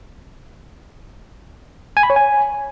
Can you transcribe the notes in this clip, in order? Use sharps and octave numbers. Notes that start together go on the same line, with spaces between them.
G#5
B5
C#5
G#5